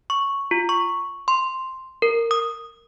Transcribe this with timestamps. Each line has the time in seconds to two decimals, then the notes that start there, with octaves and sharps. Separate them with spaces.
0.10 C#6
0.51 F4
0.69 C#6
1.28 C6
2.02 A#4
2.31 D#6